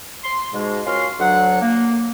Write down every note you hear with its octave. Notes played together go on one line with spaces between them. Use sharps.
C6
G#2 B2 G#3
C#4 F4 F#4 A#4 F5 C6
D2 F#3 F#5
A#3